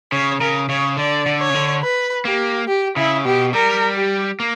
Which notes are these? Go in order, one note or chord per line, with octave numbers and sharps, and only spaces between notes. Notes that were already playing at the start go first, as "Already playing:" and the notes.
C#3 C#5
C#3 A#4
C#3 C#5
D3 D5
D3
C#5
C#3
D3
B4
A#3 G4
G4
C#3 E4
B2 G4
G3 A#4
G4
A#3